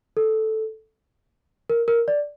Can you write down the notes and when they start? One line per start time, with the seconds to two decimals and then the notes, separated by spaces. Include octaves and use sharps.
0.17 A4
1.70 A#4
1.88 A#4
2.08 D5